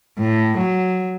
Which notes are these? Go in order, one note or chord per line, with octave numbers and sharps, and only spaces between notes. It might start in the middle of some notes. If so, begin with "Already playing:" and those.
A2
F#3